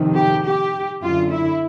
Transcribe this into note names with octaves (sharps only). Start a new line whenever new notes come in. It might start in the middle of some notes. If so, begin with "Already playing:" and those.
Already playing: F2 C3 D#3
G4
G4
F#2 D3 F4
E4